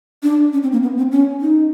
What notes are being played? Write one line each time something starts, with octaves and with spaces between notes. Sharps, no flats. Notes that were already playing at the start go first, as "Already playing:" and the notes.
D4
C#4
C4
A#3
B3
C4
C#4
D#4